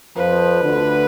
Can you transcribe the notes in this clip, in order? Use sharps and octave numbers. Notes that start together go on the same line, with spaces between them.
F2 F3 B4
D2 D3